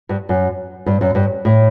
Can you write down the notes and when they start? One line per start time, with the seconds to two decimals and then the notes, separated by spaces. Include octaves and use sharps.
0.09 G2
0.29 F#2
0.86 G2
1.01 F#2
1.15 G2
1.45 A2